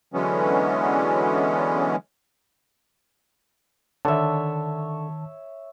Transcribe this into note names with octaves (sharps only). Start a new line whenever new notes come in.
D3 E3 F#3 G#3 B3 C#4
D3 D#3 C#5 E5 A5